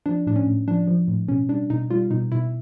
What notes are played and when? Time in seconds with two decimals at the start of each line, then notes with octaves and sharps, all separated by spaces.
0.06 F3 D4
0.27 A2 D4
0.36 C#4
0.47 A2
0.68 F3 D4
0.87 F3
1.08 A2
1.28 B2 C#4
1.49 G3 D4
1.70 B2 D#4
1.90 G3 F4
2.10 B2 D#4
2.32 B2 E4